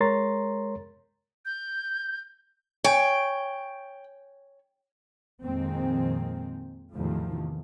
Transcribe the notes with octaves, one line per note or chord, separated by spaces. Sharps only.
G#3 A#4 C#5 A#5 C6 A6
G6
C#5 G5 G#5
F2 A#2 D#3 G#3 A#3 C4
E2 A2 C3 D#3 F3 A3